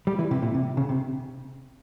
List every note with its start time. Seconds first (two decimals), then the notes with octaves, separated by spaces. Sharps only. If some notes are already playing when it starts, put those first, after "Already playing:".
0.07 G3
0.19 E3
0.31 C3
0.42 A#2
0.54 C3
0.77 C#3
0.89 C3